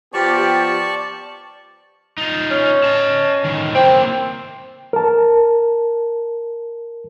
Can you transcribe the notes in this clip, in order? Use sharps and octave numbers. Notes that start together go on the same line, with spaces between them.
F3 B3 G4 D5 A5 C#6
D#4 F4
C#4
D#5 A5
A2 D#3
A#3 C4 E4
A#4 A5